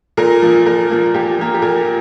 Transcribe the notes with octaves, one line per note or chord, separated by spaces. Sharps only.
A#2 A#4
F3 A#3
A#2 A#4
F3 A#3
A#2 G4
F3 A#3
G4
A#2 A#4